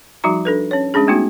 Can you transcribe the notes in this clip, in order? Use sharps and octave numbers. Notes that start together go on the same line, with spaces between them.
F3 G3 D#4 F#4 A#5
D4 A4 B4
C#4 C#5
G#3 C#4 D4 G#4
G#3 A3 B3 D#4 F#4